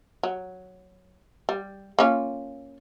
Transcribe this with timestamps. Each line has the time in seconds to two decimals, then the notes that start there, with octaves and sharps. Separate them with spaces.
0.23 F#3
1.49 G3
1.99 A#3 C#4 F4